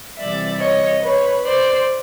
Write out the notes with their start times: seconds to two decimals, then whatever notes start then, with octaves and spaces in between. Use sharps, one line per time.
0.18 C3 E3 G3 D5 E5
0.60 C#5 D#5
1.02 B4 C#5
1.44 C5 D5